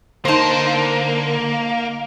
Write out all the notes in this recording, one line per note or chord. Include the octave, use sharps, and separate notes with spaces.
D3 A#3 D#4 C5 A5